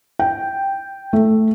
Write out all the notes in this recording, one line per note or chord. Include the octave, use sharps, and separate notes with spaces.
G5
A3